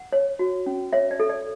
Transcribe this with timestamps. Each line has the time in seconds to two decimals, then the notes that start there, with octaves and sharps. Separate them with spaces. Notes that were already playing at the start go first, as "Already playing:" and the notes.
Already playing: F#5
0.12 C#5
0.39 F#4
0.66 C#4
0.93 C#5 E5
1.11 D5
1.20 A4
1.29 D5